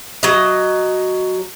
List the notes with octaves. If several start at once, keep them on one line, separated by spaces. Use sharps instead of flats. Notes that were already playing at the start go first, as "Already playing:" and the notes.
F#3 D#5